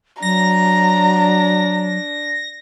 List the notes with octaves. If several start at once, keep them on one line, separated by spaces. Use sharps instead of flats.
F#3 D4 A#5 A#6